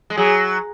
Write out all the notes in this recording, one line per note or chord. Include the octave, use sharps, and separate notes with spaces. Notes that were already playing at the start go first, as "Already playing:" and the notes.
G#3
F#3 G#4